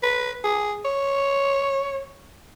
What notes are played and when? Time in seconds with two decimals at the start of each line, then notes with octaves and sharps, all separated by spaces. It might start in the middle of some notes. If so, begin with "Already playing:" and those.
0.03 B4
0.44 G#4
0.85 C#5